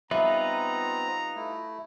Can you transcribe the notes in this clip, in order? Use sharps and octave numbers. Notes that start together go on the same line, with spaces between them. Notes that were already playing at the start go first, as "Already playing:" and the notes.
G3 B3 C4 D#4 F4 B4 E5 A#5
A3 E4